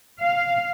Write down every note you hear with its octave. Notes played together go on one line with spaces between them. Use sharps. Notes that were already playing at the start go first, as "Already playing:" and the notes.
F5